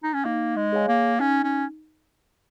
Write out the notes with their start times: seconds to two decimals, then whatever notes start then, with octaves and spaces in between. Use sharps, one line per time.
0.03 D#4
0.14 C#4
0.25 A#3 D#4
0.56 G#3
0.72 G#4 C#5 F5 G#5
0.88 A#3
1.19 C#4 D#4
1.44 C#4